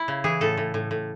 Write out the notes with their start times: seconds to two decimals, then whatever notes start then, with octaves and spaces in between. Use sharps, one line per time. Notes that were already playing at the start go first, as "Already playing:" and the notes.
Already playing: E4
0.08 C#3
0.24 E3 G#4
0.41 A2 A4
0.57 A2
0.74 A2
0.91 A2